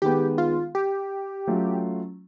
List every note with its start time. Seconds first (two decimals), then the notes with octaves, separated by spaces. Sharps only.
0.02 D#3 G#3 B3 G4
0.38 F4
0.75 G4
1.47 F#3 A3 C#4 F4